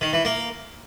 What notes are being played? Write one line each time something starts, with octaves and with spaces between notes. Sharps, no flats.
D#3
E3
A#3